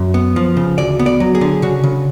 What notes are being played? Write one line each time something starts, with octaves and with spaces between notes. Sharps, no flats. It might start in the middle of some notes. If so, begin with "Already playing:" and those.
Already playing: F#2
B3
F3
C#3
D2 D5
B3
D5
F#3
G#4
D3
C#3 F#4
C#3